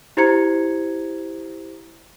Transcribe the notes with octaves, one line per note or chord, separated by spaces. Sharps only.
E4 G4 C5 A#5 G#6 C#7